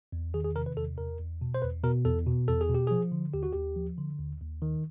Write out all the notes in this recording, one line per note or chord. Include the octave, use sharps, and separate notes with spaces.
E2
D#3 G#4
G#4
C3 A#4
B4
E2 A4
E2 A#4
E2
B2
C5
E2 B4
B2 A#4
E2 A4
B2
E2 A4
G#4
B2 G4
F3 G#4
D3
D#2 G4
F#4
D#2 G4
F3
D3
D#2
D#2
D#3